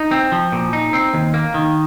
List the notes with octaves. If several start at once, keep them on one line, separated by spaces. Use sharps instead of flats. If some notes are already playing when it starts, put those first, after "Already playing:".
Already playing: D#4
C4
F3
A#2
D#4
C4
D#2
A#3
D#3